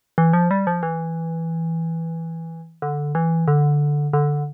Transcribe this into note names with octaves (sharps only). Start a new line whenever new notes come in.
E3
F3
G3
F3
E3
D3
E3
D3
D3